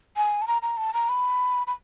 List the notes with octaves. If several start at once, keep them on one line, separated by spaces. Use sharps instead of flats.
G#5
A5
A#5
A#5
A5
A#5
B5
B5